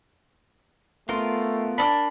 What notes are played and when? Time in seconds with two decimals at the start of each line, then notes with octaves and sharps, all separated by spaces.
1.09 A3 B3 F4 A#4 C6
1.78 A#3 B3 D4 B5